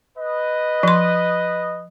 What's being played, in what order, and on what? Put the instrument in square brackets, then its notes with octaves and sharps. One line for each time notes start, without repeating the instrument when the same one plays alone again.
[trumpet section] B4 D#5
[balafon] F3 C6